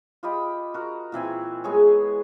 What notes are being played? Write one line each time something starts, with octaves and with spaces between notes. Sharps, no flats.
F4 G4 D#5 B5
F#4 A#4
A#2 E3 C4 G#5
G#3 B3 G#4 C#5